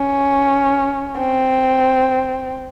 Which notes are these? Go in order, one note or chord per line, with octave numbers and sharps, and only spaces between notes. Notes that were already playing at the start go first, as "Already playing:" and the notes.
Already playing: C#4
C4